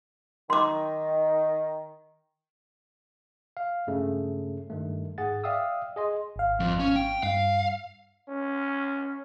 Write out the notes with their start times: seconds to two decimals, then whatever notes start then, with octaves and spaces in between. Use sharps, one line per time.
0.50 D#3 C6 D6
3.57 F5
3.87 G2 C#3 A3
4.70 G2 D#3 A3
5.18 G#2 G#4 F#5 A6
5.44 D5 E5 F5 G5 D#6 E6
5.96 G#4 D#5 C6
6.36 G#1 F5
6.60 F2
6.80 C#4
6.96 G5
7.23 G2 F5
8.29 C#4